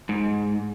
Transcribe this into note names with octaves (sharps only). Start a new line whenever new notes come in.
G#2